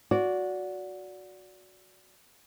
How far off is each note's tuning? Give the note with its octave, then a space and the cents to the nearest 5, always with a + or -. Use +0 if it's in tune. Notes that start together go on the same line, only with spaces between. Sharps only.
F#4 -10 D5 -25